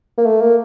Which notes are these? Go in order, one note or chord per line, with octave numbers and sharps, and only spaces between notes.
A#3
A3
A#3